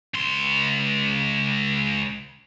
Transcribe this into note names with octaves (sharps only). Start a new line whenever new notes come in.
C#2 C6